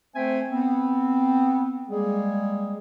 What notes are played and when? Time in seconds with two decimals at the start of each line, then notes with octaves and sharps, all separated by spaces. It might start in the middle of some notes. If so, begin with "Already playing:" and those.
0.16 A3 C4 C5 E5 G5 G#5
0.49 B3 C4
1.89 G3 G#3 A#3 G#4